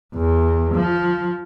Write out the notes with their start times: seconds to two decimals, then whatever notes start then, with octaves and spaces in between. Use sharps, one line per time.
0.14 E2
0.74 F3